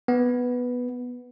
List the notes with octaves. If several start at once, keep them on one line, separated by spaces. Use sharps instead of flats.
B3